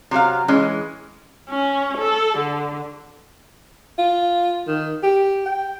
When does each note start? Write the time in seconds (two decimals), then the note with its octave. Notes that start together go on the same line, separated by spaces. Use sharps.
0.11 C3 F#3 F#4 F5
0.48 E3 G#3 C#4
1.48 C#4
1.97 A4
2.38 D3
3.98 F4
4.68 D#3
5.03 G4
5.46 G5